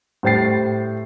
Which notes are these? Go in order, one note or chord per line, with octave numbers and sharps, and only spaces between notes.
A2 G3 C5 G5 A6 C7